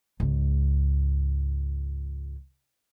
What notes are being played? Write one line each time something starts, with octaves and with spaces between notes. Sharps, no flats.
C#2 G#2